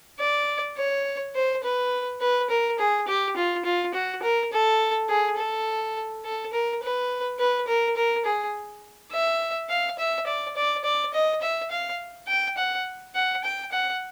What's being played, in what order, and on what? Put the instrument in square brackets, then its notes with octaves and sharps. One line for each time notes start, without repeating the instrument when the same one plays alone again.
[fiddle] D5
C#5
C5
B4
B4
A#4
G#4
G4
F4
F4
F#4
A#4
A4
G#4
A4
A4
A#4
B4
B4
A#4
A#4
G#4
E5
F5
E5
D5
D5
D5
D#5
E5
F5
G5
F#5
F#5
G5
F#5